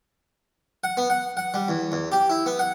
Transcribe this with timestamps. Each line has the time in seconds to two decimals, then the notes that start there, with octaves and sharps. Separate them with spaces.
0.84 F#5
0.97 B3
1.10 F#5
1.37 F#5
1.54 G3
1.68 E2
1.92 E2
2.12 G4
2.30 E4
2.46 B3
2.59 F#5